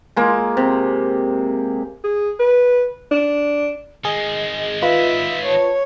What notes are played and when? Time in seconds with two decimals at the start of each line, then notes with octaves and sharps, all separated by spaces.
0.16 G#3 A#3
0.57 C3
2.04 G#4
2.40 B4
3.11 D4
4.05 D#3 G#3 G#4 D#5
4.82 F4 B4 E5
5.46 C#5 A5